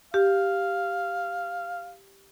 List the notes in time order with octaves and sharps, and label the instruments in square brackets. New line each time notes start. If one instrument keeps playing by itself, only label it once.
[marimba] G4 [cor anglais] F5